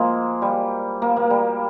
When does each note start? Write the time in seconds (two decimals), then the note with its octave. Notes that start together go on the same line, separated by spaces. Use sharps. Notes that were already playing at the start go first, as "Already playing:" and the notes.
Already playing: F3 G#3 A#3
0.42 G3
1.02 A#3
1.16 A#3
1.30 G3